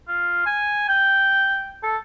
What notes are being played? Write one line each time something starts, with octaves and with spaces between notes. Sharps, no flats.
F4
G#5
G5
A4